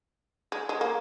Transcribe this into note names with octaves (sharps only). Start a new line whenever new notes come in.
G#3
G#3
A#3